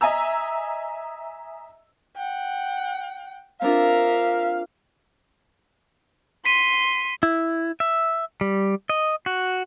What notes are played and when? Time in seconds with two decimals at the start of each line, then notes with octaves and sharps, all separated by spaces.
0.01 D#5 E5 G#5 A#5 E6
2.16 F#5 G5
3.62 C4 D4 F4 A#4 E5 F5
6.45 C6 B6 D#7
7.23 E4
7.80 E5
8.41 G3
8.89 D#5
9.26 F#4